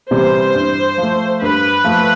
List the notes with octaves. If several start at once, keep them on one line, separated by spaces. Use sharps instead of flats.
C3 E3 G3 C5
G2
F3 A3
G2 B4
F3 A3